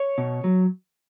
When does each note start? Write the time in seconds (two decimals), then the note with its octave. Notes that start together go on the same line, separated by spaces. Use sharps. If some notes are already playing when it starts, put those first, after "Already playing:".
Already playing: C#5
0.18 B2
0.44 F#3